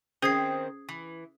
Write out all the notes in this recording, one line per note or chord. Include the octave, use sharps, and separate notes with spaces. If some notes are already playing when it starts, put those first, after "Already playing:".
D#3 C4 C#4 G#4 C5 D#6 G#6 C7
E3